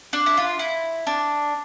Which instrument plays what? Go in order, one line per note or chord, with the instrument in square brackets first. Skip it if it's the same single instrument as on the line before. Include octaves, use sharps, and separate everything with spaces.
[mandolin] D4
E4
F4
E4
D4